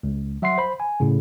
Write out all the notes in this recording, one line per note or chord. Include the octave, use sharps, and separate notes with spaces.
C#2
F#3 E5 F#5 C6 C7
C5 B5
G#5
A2 C#3